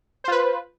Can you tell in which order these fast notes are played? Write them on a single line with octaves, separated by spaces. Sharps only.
C5 F4 B4